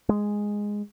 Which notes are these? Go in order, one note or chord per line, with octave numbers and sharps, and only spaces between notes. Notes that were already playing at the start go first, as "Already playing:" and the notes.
G#3